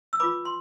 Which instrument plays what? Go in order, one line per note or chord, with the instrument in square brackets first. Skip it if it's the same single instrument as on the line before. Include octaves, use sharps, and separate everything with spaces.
[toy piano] E6
F4 B4 B5 D6
C6